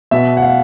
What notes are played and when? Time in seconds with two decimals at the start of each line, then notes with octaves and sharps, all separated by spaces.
0.11 B2 E5
0.37 F#5
0.42 F5